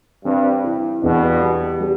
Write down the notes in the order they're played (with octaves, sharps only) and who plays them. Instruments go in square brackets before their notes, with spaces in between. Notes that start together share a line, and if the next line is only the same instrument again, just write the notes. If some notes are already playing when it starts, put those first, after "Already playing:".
[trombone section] G2 [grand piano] C4
[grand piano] E4
[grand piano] E2 [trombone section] G2 B2
[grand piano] G3
G3